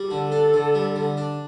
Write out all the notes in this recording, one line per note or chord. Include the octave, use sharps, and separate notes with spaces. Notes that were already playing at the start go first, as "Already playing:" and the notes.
Already playing: G3
D3 A4
D4
D3
G3
D3
D4